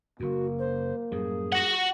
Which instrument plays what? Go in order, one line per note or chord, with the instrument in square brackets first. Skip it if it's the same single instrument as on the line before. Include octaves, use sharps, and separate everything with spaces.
[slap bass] F#1 F#2 [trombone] A#3 [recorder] F#4
[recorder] C5
[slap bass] F#2 A2 G3 [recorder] G#4
[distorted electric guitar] F#4 F#5